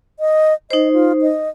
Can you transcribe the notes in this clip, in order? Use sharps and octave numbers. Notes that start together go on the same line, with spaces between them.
D#5
D#4 C5 D#5
F4
D#5